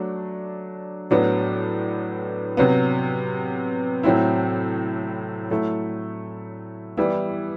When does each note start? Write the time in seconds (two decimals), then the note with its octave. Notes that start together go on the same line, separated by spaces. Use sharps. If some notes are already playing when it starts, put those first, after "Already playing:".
Already playing: F#3 A3 D4
1.11 A2 F#3 B3 D4
2.57 C3 F#3 B3
4.03 A2 F#3 C4 E4
5.51 F#3 A3 E4
6.97 E3 G3 B3 E4